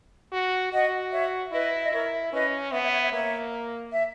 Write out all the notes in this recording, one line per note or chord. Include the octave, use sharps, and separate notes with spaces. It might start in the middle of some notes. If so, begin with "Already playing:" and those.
F#4
F#4 D#5 F#5
C#5 E5
E4 B4 D#5
E5
D#5
E4 A#4 C#5
C#4 B4 D#5
B3 C#5 E5
C#5 E5
C#5 E5
C#5 E5
A#3 C#5 E5
E5